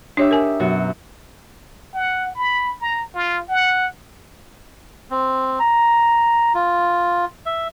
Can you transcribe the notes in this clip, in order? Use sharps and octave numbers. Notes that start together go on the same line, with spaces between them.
D4 D#4 G4 C#5 E5
A#4 G#5
F#2 B2 F#4
F#5
B5
A#5
F4
F#5
C4
A#5
F4
E5